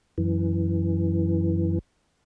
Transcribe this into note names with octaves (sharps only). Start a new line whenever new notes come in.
F#2 E3